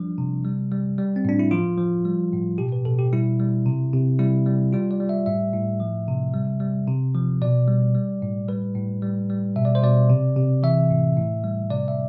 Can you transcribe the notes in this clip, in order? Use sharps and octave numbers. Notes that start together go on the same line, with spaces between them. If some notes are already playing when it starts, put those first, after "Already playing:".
Already playing: F3 G3 D4
C3
G3
G3
G3
C4
A2 D4
E4
F3 F4
F3
G3
A2
B2 G4
B4
B2 A4
G4
G3 E4
G3
C3
C3
G3 E4
G3
G3 F4
D5
G3
E5
A2 E5
A2
F3
C3
G3
G3
C3
F3
B2 D5
G3
G3
A2
G3 B4
A2
G3
G3
B2 E5
D5
C5
B2 D5
C3
C3
E3 E5
A2
A2
G3
C3 D5
E5